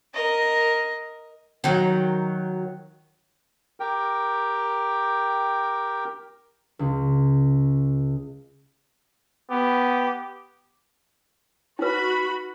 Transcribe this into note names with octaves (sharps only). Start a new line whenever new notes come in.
A#4 D#5
D#3 F#3
G4 A#4 G5
C#2
B3 G4
D#4 F#4 B4 B5